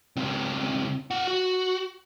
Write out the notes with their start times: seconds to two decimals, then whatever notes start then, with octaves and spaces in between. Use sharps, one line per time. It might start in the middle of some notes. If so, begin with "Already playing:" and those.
0.16 C#2 C4
1.11 F4 F#5
1.28 F#4